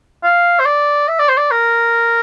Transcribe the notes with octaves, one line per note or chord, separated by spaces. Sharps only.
F5
C5
D5
E5
D5
C5
D5
A#4